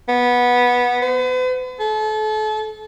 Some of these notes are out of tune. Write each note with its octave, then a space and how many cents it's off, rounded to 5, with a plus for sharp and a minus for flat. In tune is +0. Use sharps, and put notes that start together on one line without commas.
B3 -15
B4 +45
A4 -35